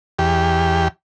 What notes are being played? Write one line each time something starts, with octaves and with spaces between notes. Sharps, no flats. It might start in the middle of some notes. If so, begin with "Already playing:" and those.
E2 G4